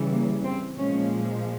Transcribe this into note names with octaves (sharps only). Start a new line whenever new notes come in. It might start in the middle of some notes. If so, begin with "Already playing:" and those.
Already playing: C#3 E3 G3
A#3
C4
A#2 F3 G#3 C#4